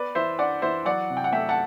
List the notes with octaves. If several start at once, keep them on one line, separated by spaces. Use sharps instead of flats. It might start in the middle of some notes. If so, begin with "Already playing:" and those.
Already playing: B3 B4 D5
E3 C5 E5
D4 D5 F#5
E3 C5 E5
F#3 D5 F#5
C3
G5
F#5
A3 E5 G5
F#5 A5